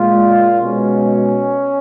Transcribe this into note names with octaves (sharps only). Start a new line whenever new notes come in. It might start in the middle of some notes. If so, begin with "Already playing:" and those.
Already playing: A#2 G#3 F4
B2 G#3 C#4